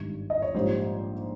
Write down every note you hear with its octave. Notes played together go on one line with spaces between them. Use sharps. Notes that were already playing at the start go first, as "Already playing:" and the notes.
Already playing: G#1 G2 D#3
D#5
C#5
A#1 G#2 G3 C5